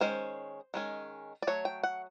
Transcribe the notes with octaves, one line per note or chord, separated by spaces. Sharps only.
D#3 G#3 C#4 C5
D#3 G#3 C#4
D5
F#3 A3 C#5
G5
F#5